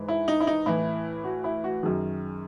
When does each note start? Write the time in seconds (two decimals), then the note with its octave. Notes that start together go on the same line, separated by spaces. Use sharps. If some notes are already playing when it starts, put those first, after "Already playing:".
Already playing: G#2 E3
0.08 E4
0.28 D#4
0.40 E4
0.47 D#4
0.66 A2 E3 E4
1.24 F#4
1.44 E4
1.64 F#4
1.83 F#2 D#3 G#4